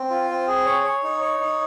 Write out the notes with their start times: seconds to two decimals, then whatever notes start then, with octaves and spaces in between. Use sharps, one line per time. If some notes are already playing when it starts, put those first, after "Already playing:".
Already playing: C4
0.10 F4
0.29 C4
0.48 G#4
0.66 C#5
0.84 C#5
1.03 D#4
1.21 C#5
1.40 D#4